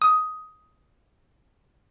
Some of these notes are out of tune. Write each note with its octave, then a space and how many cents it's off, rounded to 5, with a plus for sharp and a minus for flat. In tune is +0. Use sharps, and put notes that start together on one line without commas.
D#6 +10